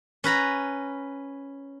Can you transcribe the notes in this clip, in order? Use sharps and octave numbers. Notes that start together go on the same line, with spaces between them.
C#4 B4 A#5 B5